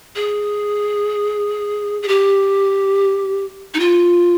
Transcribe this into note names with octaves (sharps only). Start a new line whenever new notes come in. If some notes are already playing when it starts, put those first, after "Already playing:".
G#4
G#4
G4
D#4
F4